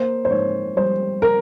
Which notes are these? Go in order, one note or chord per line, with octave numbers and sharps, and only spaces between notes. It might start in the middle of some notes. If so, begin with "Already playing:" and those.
Already playing: A#3 C5
C5
G#2 C#5
G3 C5
A#4